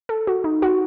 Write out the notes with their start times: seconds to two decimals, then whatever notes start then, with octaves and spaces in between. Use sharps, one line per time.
0.09 A4
0.27 F#4
0.44 D#4
0.62 F#4